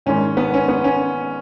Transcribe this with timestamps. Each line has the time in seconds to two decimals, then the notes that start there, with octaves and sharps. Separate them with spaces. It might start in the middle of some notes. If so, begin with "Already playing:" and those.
0.06 G#1 G#2 D#3 C#4
0.37 B3
0.54 C#4
0.68 B3
0.84 C#4